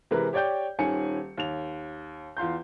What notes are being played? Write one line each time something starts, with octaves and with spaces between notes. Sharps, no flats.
C3 E3 G#3 A#4 B4
G4 C#5 D5 G5 G6
D#1 D#3 C#4 G#5 C#7
D#2 F7
E2 F4 C6 G6